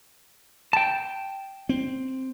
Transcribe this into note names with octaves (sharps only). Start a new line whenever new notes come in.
G5 A5
C4